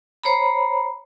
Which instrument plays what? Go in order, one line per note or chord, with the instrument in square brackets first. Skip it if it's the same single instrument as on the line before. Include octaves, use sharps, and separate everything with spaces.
[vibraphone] C5 C#5 A#5 B5